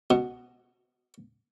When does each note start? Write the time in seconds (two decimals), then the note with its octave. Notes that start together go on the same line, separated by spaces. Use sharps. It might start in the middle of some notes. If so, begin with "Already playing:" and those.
0.10 B2